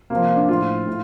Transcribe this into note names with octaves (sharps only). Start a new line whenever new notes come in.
C3 F3 A#3
D4
A2 F3 F4
A2